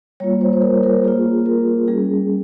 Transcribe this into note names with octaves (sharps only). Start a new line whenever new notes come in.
G3 A#3 F4 C#5
C5
C5
A#4
A#4
A#3 F4 G#4
A#4
G3 C#4 G#4